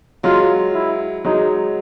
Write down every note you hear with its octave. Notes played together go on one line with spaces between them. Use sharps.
F#3 G#3 F4
E4
F#3 G#3 D#4